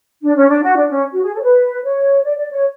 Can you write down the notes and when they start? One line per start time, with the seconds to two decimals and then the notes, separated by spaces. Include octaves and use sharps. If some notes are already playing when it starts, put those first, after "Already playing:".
0.23 D4
0.36 C#4
0.49 D4
0.63 F#4
0.77 D4
0.90 C#4
1.14 F#4
1.24 G#4
1.34 A4
1.40 C#5
1.44 B4
1.85 C#5
2.25 D5
2.38 D5
2.52 C#5